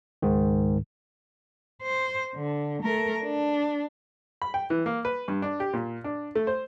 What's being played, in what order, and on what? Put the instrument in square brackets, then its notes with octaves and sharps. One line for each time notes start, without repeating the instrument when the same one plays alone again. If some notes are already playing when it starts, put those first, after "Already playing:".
[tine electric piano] C#2 G#2 D#3
[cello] C5
D3
A3 A#4
D4
[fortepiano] B5
G5
E3
A#3
B4
G2
D4
G4
A#2
D4
A3
C5